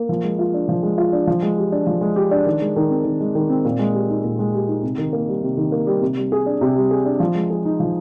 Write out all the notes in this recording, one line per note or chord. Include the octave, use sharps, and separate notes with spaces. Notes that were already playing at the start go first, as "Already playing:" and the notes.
Already playing: A#3
F3
G#3
F4
D4
F3
G#3
F4
D4
F3
G#3
G4
D4
F3
G#3
G4
D4
D#3
G#3
D#3
C4
D#3
G#3
D#3
C4
A#2
G#3
G4
D#4
A#2
G#3
G4
D#4
C3
D#3
A#3
G3
C3
D#3
A#3
G3
C3
G3
G#4
D4
C3
G3
G#4
D4
F3
G#3
G#4
D#4
F3